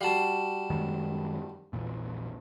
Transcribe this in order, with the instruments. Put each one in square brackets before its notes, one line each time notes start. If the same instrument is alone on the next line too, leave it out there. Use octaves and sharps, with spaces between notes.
[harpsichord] G3 F#4 [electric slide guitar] F5 A5
[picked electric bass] F#2 D#3 G#3
A#1 E2 A#2